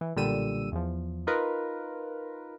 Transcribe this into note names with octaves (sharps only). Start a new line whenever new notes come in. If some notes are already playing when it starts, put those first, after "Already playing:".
E3
B1 A#2 D3 G3 E6 D#7
E2 F3
D#4 F4 A#4 B4